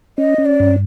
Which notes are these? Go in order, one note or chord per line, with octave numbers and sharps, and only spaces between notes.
C#4 D#5
C#4
D5
G2